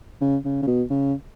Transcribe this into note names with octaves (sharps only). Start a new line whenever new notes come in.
C#3
C#3
C#3
B2
C#3